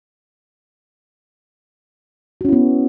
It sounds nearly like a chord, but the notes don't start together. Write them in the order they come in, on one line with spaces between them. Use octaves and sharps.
F#4 C#4 E4 B3